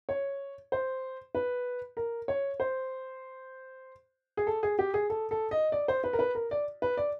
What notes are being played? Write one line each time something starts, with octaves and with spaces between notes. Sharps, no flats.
C#5
C5
B4
A#4
C#5
C5
G#4
A4
G#4
G4
G#4
A4
A4
D#5
D5
C5
B4
A#4
B4
A#4
D5
B4
D5